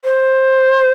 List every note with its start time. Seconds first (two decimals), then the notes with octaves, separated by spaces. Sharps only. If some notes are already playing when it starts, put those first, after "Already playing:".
0.05 C5